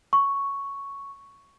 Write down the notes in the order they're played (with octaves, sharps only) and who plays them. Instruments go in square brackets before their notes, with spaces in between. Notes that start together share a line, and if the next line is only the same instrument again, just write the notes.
[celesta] C#6